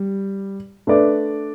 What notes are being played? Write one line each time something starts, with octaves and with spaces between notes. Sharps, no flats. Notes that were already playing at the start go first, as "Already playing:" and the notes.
Already playing: G3
A3 D4 B4 D5